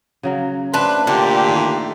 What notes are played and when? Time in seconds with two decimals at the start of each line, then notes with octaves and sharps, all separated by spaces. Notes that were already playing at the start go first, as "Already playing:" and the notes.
0.23 C#3 F#3 A#3
0.74 A3 C4 D4 B4 C6
1.07 A#2 D3 G4
1.49 D#3 E4